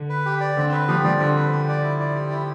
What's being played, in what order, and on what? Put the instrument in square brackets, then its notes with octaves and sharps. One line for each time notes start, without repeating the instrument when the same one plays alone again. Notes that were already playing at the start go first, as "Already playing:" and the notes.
Already playing: [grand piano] D3
[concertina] B4
G4
D5
[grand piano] D3 [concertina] C4
[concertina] B4
[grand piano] F3 [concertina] G4
[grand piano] G3
[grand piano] F3 [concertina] D5
[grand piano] D3 [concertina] C4
[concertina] B4
G4
D5
E4
D5
G4
E4